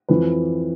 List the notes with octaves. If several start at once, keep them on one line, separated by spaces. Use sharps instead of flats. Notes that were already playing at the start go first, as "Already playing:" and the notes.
F2 E3 B4